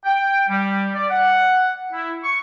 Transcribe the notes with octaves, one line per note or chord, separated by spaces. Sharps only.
G5
G3
D5
F#5
E4
C#6